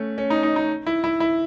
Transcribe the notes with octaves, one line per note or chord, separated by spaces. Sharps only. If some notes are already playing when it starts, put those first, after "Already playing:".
Already playing: A3 C#4
C#4
D#4
D#4
D#4
E4
E4
E4